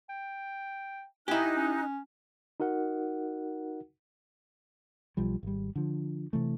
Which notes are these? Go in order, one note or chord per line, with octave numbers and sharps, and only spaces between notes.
G5
D#4 E4 G4 G#5 F#6
C#4
D#4 F#4 A#4 F#5
B1 F3 G3
G#1 G3
D3 F3
C3 E3 A3